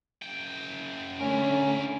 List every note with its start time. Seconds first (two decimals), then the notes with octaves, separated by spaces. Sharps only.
0.22 F#2 G5
1.20 D3 A3 C#4 E4 A#4